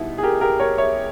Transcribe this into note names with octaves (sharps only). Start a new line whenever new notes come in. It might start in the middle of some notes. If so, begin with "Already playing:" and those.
Already playing: B2 G3 B3 D#4 E4
G#4
G4 A#4
G4 A#4
A#4 C#5
C#5 E5